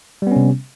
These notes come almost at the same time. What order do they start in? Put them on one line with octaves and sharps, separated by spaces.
G3 B3 C#4 C3